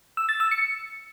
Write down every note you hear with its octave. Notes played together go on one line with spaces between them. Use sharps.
E6
A6
E6
C#7